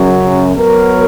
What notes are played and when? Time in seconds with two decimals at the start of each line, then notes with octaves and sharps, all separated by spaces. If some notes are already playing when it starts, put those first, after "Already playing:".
Already playing: F#2 C#3 F#3
0.54 F#3 B3 F#4 A#4 C#5